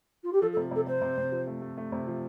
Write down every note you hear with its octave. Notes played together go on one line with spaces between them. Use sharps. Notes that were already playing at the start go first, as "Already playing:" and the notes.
F4
G4
F3 A4
A4
C3
C3 A4
C3 C5
C3
C3
F3
A3
A3
A3
C3
F3